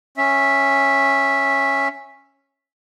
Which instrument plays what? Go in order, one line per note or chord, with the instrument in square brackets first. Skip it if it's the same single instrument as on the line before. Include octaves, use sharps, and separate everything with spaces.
[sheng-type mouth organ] C#4 E5